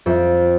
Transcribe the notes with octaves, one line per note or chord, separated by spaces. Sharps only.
F2